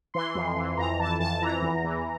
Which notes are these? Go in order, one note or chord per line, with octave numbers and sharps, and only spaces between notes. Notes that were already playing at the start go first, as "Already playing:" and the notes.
E3 C6
F2
E3
F2 A#5
E3 A5
F2 A5
E3 A#5
E2
E3